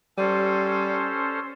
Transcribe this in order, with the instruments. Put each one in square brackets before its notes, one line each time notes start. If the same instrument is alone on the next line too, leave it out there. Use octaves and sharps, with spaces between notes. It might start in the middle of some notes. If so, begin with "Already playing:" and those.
[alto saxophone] G3 [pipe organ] C#4 A4 C5